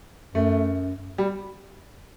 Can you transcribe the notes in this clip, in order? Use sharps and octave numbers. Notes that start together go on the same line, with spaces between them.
F#2 A3
G3